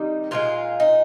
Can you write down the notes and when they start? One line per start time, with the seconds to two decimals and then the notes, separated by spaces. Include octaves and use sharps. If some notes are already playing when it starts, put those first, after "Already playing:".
Already playing: C3 D#3 G3 D#4
0.31 A#2 F3 G#3 F4
0.80 D#4